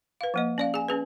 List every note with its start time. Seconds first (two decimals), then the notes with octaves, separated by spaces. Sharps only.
0.21 B4 F5
0.34 F3 A#3 D#5
0.58 C#4 D5 F5
0.74 G#4 G#5
0.88 C#4 G#4 B4